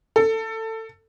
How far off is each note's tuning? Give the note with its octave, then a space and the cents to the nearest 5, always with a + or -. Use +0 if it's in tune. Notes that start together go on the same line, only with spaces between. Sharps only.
A4 +20